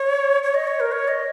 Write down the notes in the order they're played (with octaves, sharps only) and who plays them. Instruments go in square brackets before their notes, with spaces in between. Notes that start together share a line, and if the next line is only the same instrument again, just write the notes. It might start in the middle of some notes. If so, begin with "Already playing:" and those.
Already playing: [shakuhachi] C#5
C#5
D#5
C#5
A#4
C#5
D#5